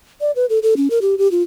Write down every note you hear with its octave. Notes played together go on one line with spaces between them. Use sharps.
D5
B4
A4
A4
C#4
A#4
G4
G4
F4